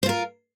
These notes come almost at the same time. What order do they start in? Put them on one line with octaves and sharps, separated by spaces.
C5 F4 A#4